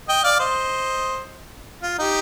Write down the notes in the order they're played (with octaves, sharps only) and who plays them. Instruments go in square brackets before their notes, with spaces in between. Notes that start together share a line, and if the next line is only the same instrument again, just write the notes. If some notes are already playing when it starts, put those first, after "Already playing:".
[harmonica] D#5 G5
D5 F5
C5 D#5
F4
D#4 G4